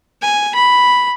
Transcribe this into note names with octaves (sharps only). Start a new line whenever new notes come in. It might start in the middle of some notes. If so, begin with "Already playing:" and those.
G#5
B5